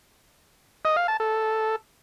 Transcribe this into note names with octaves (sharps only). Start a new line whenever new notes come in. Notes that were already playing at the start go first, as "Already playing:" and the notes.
D#5
F5
A5
A4